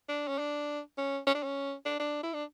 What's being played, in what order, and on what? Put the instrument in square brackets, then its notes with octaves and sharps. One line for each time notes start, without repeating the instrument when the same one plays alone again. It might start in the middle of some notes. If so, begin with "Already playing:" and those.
[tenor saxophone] D4
C#4
D4
C#4
C#4
D4
C#4
D4
D4
E4
D4